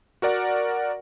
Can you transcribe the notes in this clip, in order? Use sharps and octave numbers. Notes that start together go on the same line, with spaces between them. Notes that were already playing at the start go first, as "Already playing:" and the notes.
F#4 A#4 D5 F#5